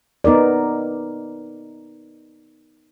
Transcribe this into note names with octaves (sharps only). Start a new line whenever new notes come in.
B3 D#4 A#4 D5